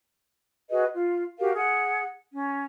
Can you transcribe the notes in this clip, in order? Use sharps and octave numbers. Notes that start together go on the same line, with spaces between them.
F#4 G#4 B4 D#5
F4
F#4 G4 A#4 F5
G#4 F#5
C#4